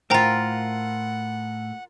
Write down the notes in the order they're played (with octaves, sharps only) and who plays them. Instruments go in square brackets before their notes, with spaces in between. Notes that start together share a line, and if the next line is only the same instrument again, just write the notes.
[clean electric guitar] A2 [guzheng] F4 A#4 [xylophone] C5 G5 A#5 [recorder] F#5